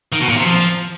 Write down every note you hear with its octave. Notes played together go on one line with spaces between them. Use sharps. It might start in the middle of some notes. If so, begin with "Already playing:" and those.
D#3
B2
A#2
C3
F3